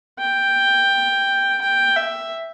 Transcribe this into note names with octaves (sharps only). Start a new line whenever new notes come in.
G5
G5
E5